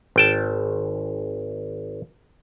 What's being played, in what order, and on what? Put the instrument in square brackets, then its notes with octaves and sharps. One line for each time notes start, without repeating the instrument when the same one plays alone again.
[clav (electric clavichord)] G#1 G5 A5